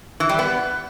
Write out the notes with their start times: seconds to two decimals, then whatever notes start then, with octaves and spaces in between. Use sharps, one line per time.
0.20 E3
0.29 G3
0.39 B3